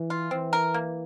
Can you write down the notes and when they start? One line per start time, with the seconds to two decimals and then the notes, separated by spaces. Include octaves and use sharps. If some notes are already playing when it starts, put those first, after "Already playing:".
Already playing: E3
0.10 F4
0.31 E3 C4
0.53 A#4
0.74 A#3